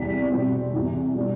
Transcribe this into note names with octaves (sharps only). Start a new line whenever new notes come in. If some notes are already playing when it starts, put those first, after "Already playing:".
Already playing: E2 C3 G3 B6
B2 G3 C4
E2 C3 E3
B2 G3 B3 D4